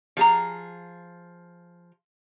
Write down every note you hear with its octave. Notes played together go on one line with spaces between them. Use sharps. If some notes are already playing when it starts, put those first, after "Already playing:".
F3 G#4 A#5